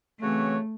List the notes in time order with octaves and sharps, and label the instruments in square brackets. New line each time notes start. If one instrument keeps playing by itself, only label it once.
[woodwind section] C#3 E3 C4 F#4 C#5 [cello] A3